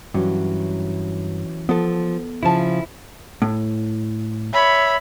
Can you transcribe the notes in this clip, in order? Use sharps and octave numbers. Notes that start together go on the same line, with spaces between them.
G2 E3 F#3 C#4
F3 B3 A4
C#3 F3 E4 A5
A2
C#5 E5 B5